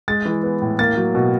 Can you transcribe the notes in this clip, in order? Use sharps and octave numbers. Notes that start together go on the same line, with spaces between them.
G#3 A6
E3
B3
A2
A#3 A6
F#3
B2